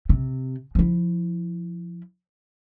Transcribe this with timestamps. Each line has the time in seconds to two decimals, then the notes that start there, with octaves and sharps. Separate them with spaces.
0.09 C3
0.75 F3 E4